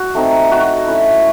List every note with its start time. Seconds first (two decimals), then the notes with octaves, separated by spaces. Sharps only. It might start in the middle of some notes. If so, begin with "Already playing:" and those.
Already playing: F#4
0.15 A3 C4 D#4
0.51 F#4
0.87 A3 C#4 E4